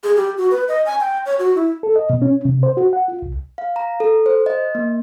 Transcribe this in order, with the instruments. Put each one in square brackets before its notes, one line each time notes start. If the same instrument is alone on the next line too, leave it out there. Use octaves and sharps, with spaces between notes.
[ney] G#4
G4
F#4
B4
D#5
G#5
G5
C#5
F#4
E4
[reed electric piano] A4
D#5
B2
C#4
C3
C5
F#4
F#5
F4
C2
[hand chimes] F5
A#5
A4
C5
D#5
A#3